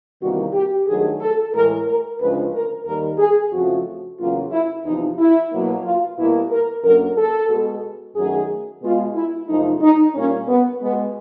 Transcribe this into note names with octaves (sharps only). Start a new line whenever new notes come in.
E2 C3 D#3 G3 A#3 F#4
G4
G2 D#3 F#3 A3 G#4
A4
A2 E3 G#3 A#4
A#4
D2 C#3 F3 G#3 B4
A#4
D#2 D#3 G3 A#4
G#4
F2 C#3 F3 A3 F#4
E2 C#3 F#3 A#3 F4
E4
E2 C3 F3 D#4
E4
B2 F#3 A#3
F4
B2 G3 A#3 E4
A#4
F#2 D3 F#3 A#3 A#4
A4
B2 G#3
F#2 D#3 F#3 A3 G#4
B2 G#3 F4
E4
F#2 C#3 F3 A3 D#4
D#4
A#2 G3 A#3 C#4
B3
B2 G#3 B3